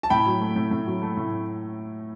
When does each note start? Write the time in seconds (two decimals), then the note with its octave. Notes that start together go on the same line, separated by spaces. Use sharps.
0.03 A5
0.10 A2 G5 B5
0.26 F#3
0.41 A3
0.56 A2
0.71 A2
0.87 F#3
1.02 A3
1.17 A2